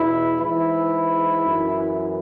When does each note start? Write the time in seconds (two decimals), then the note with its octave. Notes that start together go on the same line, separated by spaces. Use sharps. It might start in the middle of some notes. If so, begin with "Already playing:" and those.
Already playing: E2 B2 E4
0.39 G#2 E3 E4
1.45 F#2 E3